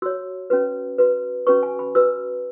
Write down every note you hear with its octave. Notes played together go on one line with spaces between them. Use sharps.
F#4 C#5 E6
C#4 F#4 B4
F#4 B4
C#4 F#4 B4 C#6
G#5
B5
F#4 B4 E6